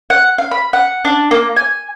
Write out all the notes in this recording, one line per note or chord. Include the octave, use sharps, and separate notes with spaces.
F#5
F5
B5
F#5
D4
A#3
G#5